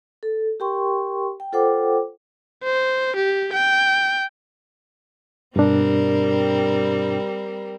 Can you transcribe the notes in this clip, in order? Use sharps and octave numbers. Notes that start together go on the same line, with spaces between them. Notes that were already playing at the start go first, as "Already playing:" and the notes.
A4
G4 A#4 G5 C6 C#6
G5
F4 A4 C5 F#5 G5 D6
C5
G4
G5
G2 B2 G3 C4 D4 A#4